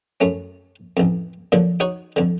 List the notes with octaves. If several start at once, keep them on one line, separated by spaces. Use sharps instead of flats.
F#2 A3 C#4
A1 F2
A#2 D3 F3 F#3
D#4 F#4 C#5
F2 D3